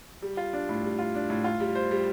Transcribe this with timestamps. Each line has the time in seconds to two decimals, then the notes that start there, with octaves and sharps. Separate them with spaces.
0.22 G3
0.37 F4
0.53 D4
0.69 A2
0.84 G3
0.99 F4
1.15 D4
1.30 A2
1.44 F4
1.60 G3
1.75 C5
1.91 G3